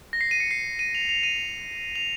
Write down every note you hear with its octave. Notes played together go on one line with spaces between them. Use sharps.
A#6
C7
D#7
C#7
C7
D#7
F7
F7
D#7
F7